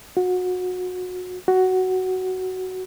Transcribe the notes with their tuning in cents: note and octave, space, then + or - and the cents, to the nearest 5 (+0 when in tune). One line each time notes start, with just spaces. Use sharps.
F#4 -25
F#4 +10